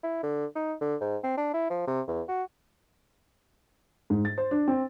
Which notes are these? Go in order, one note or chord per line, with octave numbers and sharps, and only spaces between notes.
E4
D3
D#4
D3
G#2
C4
D4
E4
F3
C3
E2
F#4
G#2
A6
C5
D4
C4